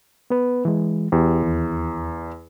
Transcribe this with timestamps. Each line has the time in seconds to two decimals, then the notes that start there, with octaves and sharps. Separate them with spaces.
0.30 B3 B4
0.65 E3 G#3
1.12 E2 G4
1.43 D#2